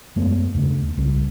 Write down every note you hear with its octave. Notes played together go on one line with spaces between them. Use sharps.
F#2 G#3 A3 B3
D#2 C#3 A3
C2 C#3